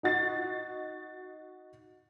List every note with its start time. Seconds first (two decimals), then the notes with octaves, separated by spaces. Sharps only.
0.03 D#4 F#4 A6 C7